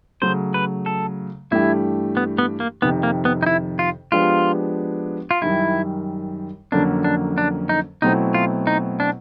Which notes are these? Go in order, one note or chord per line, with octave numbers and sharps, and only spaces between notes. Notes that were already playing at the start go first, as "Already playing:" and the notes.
C#3 F#3 A3 C5
B4
A4
G2 E3 A3 D4 E4 G4
B3
B3
A#3
F2 C3 D#3 B3
A#3
B3
D#4
E4
F4
F3 G#3 B3 D4 F4 G4
F4
F#2 D#3 G3 E4
F2 D3 F#3 A#3 C#4 D4
D4
D4
D#4
B2 F#3 A3 C4 D#4 E4
F4
D#4
D4